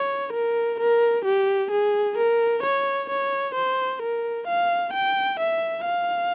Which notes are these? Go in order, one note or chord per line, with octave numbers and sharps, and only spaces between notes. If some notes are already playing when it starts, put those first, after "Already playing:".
Already playing: C#5
A#4
A#4
G4
G#4
A#4
C#5
C#5
C5
A#4
F5
G5
E5
F5